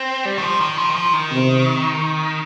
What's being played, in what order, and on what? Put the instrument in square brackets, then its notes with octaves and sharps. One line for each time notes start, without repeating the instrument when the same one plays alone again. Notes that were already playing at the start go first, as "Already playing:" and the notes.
Already playing: [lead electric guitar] C4
G3
D#3
F3
D#3
F3
D#3
F3
D#3
[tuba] C3